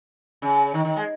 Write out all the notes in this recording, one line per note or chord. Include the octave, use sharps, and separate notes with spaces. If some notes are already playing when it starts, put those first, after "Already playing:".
C#3
D#3
D#3
G#3